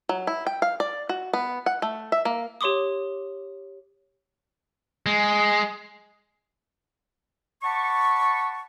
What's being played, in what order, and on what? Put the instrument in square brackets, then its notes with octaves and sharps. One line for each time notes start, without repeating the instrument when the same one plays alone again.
[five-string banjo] F#3
E4
G5
F5
D5
F#4
B3
F#5
A3
E5
A#3
[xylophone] G4 C#5 C6 D6 D#6
[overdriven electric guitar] G#3
[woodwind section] D5 F#5 A5 B5 C#6